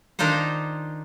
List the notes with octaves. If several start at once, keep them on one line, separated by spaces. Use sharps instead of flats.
D#3 D4 D#4 F4 C5